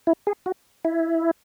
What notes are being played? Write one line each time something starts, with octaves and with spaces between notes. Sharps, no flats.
E4
G#4
F#4
E4